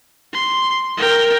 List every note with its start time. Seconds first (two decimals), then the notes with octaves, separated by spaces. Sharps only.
0.33 C6
0.97 A#4 G5